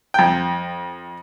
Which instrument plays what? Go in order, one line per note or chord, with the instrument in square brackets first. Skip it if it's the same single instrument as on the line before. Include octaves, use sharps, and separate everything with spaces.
[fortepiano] F2 G5